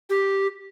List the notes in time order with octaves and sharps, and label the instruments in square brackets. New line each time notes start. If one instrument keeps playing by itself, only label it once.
[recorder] G4